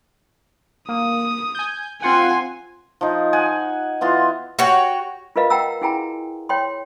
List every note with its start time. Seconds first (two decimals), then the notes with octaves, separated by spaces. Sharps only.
0.89 A#3 D#6
1.55 G#5 G6
2.02 C4 F4 F#5 G#5 C6
3.01 F3 D#4
3.33 F#5 G#5
4.01 E3 B3 F4 C6
4.59 F#4 C#5 G5
5.36 F4 A#4 B4 D#5 F5
5.50 F#5 G5 A#5 E6
5.81 E4 F#4 G#4 G5 G#5 A#5
6.49 C#5 G5 C6